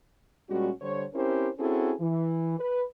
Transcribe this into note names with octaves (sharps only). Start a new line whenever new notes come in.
A#2 G3 G#3 C#4 F#4
D3 G3 C5 C#5
C4 C#4 E4 G4 A#4 C5
C4 C#4 E4 F#4 G#4 A4
E3
B4